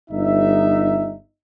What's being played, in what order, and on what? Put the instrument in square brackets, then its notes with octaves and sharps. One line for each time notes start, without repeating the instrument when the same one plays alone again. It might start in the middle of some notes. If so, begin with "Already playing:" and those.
[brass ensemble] G1 D#4 E5